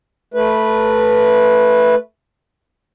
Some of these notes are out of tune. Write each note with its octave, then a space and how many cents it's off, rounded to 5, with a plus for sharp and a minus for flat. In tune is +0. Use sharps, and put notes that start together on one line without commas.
A3 +0 B4 -10